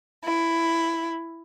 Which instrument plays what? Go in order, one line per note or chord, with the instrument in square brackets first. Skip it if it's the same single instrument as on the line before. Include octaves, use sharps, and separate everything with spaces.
[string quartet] E4